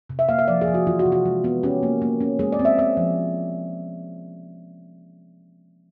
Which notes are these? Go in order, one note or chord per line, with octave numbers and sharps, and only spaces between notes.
C3
E5
A#3 F5
E5
F3 D5
G#4
F3
F#4
E3 F4
F#4
C3
F#4
G#3
B3
C#4 G4
A#3
A#3
C#4
G#3 G#4
D5
C4
E5
C4 E5
F3